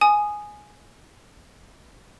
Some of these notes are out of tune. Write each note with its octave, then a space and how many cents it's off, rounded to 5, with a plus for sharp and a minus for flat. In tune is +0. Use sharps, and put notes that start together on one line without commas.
G#5 +5 D#6 -15